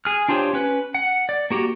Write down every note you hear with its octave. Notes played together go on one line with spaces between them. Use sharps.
G#4 F6
D4 F4 G4 C5 C#5
C#4 B4
F#5
D5
A#3 F#4 G4